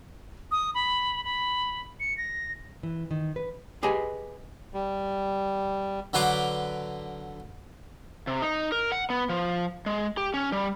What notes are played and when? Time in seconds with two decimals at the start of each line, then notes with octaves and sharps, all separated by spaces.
0.52 D#6
0.75 B5
1.25 B5
2.00 C#7
2.18 A#6
2.83 E3
3.11 D#3
3.36 B4
3.83 G4 G#4 B4 D#5 G#5
4.74 G3
6.13 D3 F#3 B4 F5 C6 D6
8.27 C3
8.42 D#4
8.72 A#4
8.92 F#5
9.10 B3
9.29 F3
9.86 G#3
10.17 G4
10.34 C#4
10.52 G3